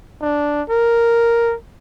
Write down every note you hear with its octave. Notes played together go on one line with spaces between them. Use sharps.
D4
A#4